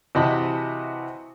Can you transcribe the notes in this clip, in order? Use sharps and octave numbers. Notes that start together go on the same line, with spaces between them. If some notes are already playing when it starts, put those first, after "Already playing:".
C3 E3 F#4 D#5 A5 B5